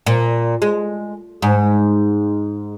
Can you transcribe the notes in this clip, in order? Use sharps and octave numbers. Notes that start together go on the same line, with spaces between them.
A#2
G#3
G#2